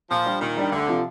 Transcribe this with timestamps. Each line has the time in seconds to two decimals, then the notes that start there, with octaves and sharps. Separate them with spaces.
0.11 A#2 F3
0.26 G3 D4 G4
0.41 A#2 D#3
0.57 G3 D4 G4
0.72 D2 D3
0.87 C3 F3